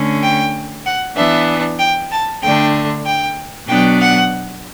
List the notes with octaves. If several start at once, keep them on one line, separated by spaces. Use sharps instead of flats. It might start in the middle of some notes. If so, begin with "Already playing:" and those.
Already playing: D3 A3 C#4
G5
F#5
E3 B3 D4 E5
G5
A5
D3 A3 D4 G5
G5
B2 F#3 B3 D4 G5
F#5